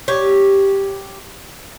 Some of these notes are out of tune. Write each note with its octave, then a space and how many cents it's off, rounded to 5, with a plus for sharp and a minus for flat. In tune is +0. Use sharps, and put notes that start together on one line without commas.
G4 +0 C#5 +0